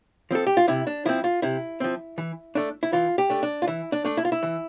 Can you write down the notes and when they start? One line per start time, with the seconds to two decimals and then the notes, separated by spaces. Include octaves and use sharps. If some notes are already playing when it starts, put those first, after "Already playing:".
0.31 F3 C4 A4
0.47 G4
0.57 F4
0.68 C3 E4
0.87 D4
1.05 F3 C4 E4
1.24 F4
1.42 C3 E4
1.80 F3 C4
2.18 E3
2.55 A3 D4
2.83 E4
2.93 E3 F4
3.18 G4
3.30 A3 D4
3.43 D4
3.62 F4
3.67 E3 E4
3.92 D4
4.04 A3 D4
4.17 E4
4.25 F4
4.32 E4
4.43 E3